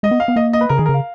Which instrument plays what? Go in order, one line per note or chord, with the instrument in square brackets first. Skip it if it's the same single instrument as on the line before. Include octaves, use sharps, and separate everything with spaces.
[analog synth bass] G#3 [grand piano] D#5
[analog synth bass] B3
[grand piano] F5
[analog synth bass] B3
[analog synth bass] A#3 [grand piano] D#5
[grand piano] D#5
B4
[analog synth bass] C#3 [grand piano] A#4
[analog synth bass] D#3 [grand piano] G#4
[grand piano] A#4
[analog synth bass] C#3
[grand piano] F5